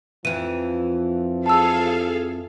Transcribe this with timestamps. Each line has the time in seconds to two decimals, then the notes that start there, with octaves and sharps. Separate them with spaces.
0.25 F2 E3 F3 D#7
1.46 G#4 A4 F5 A5 E6